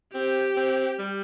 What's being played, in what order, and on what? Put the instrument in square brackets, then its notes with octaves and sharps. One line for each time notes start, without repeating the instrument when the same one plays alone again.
[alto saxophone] C4 [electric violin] G4
[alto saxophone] C4
G3